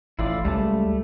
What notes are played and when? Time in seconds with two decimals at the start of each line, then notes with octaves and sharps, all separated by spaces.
0.19 A1 E4 F4 D5
0.45 C#2 G3 A3 A5